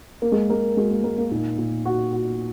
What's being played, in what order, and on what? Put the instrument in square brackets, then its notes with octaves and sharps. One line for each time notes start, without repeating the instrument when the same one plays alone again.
[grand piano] A#3 [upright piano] A#4
[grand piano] G#3
[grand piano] G#3 [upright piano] A#4
[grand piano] G#3 [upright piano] F#4
[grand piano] A#3
[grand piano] G#3 [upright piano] A#4
[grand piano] A#3
[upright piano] A#2 [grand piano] D#4
[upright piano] A#2
F#4
F#4